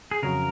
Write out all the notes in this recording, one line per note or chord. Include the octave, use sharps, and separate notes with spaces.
G#4
F2 C#3 F#3 C#4 F#4 A#4